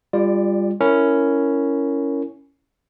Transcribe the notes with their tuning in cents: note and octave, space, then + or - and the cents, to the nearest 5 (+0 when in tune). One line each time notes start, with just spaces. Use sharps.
G3 +30 F4 +0 D5 +0
C#4 +5 E4 +0 A#4 -10